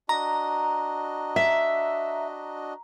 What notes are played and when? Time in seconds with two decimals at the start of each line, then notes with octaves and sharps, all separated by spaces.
0.09 D4 F#4 D#5 A#5
1.36 E5